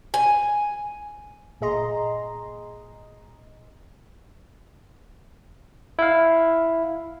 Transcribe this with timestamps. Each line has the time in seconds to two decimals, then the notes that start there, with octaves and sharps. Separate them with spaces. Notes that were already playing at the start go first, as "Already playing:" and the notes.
0.14 G#5
1.61 G1 A#2 G#4 D#5 A#5 C6
5.99 E4 F5